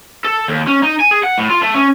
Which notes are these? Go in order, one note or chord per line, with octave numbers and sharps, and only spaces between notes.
A4
D#2
C#4
D#4
G#5
G#4
F#5
A2
F4
A3
C#4